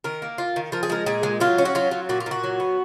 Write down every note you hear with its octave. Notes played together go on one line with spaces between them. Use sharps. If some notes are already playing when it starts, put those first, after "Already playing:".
D#3 A#4
A#3
F4
D#3
F3 A#4
G#4
G#3 A#4
A#2 G#4
G#3
F#3 F4
C#4
F#4
F#3 F4
F#3
A#2 F#4
F4
A#2 F#4
F#3
B3